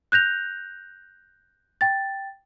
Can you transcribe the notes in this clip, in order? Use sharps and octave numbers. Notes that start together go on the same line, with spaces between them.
F#6 G6 A#6 F7
G5 A6